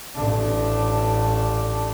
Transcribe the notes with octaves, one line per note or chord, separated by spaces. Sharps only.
A1 D4